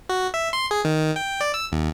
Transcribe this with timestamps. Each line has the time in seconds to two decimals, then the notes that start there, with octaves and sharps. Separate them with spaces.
0.09 F#4
0.34 E5
0.53 C6
0.71 G#4
0.85 D#3
1.16 G5
1.41 D5
1.54 E6
1.72 D#2